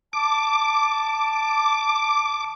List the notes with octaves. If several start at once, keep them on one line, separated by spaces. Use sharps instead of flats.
A5 D6